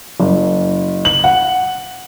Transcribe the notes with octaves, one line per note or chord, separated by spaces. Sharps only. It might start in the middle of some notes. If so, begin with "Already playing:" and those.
F#1
F#7
F#5